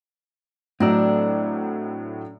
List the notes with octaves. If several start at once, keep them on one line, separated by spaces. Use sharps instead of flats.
A2 F#3 A3 C4 D4 D5 A#5 E6